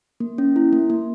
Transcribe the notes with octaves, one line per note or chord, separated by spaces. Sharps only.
A#3
C#4
E4
A#3
A#3